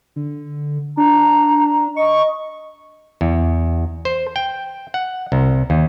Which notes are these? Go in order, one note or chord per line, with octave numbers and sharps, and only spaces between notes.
D3
D4 A#5
D#5 C#6
E2
C5
G5
F#5
C2
D#2